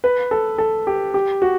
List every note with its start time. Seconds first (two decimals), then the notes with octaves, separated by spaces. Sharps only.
0.04 B4
0.31 A4
0.58 A4
0.87 G4
1.14 G4
1.42 F#4